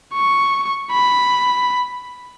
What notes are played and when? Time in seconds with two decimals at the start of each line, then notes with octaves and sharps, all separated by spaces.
0.14 C#6
0.91 B5